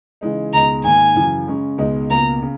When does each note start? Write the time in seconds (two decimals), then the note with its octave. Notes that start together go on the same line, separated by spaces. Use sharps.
0.21 C#3 E3 G#3 D#4
0.53 C#2 B2 G#3 D#4 A#5
0.84 G#2 D#3 A#3 G#5
1.16 F#2 C#3 E3
1.47 C#3 G#3 C#4
1.78 C#2 B2 G#3 D#4
2.10 C#2 B2 A#3 A#5
2.42 C#3